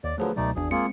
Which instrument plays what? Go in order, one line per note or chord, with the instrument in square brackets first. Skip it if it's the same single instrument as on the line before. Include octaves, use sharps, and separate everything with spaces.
[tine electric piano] D#2 [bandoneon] D5
[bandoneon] D3 F3 F#3 [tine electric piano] A3 G#4 B4
[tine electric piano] C#2 B2 F#3 [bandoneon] A3 D#4 D5
[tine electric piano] G#1 E2 D4 [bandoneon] G#4
[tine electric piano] G#3 C4 C#7 [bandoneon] A#3 F4 G#4